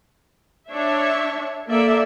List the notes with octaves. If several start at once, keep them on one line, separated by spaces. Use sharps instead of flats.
D4 C#5 E5
A#3 A4 D5 E5